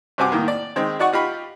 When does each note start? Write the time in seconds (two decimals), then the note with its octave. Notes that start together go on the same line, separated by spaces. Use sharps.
0.18 G2 C3 C4 F#4 G#5 D6
0.32 A2 D#3 A#3
0.48 D5
0.76 D#3 G#3 C4
0.99 D#4 F#4 D5 F#5 C#6
1.13 D#4 F4 G4 B5 C#6